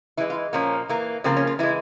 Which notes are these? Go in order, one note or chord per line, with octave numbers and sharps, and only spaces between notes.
E3 G#3 E4
F4
A#2 F3 A#3 C#4
E3 A#3
C#3 F3 A#3 C4
C#4
F4
E3 G#3 E4